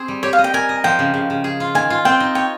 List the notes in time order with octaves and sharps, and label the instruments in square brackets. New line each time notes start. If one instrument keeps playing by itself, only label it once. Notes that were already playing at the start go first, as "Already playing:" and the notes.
Already playing: [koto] C4 G#4 C5
G3
[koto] G4 [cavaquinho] C#5
[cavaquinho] F5
[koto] D#5
[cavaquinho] G5
[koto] A#4 [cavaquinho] G#5
[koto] D#5
[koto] F3 [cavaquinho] G5
[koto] C#3
C#3
C#3
G#4
F4
[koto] D#3 [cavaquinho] G#5
[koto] F4
[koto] C4 [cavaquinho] G5
[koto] D#4
[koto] C#5 [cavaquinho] G5